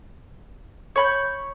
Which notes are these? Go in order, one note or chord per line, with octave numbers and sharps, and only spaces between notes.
C#5 B5 G6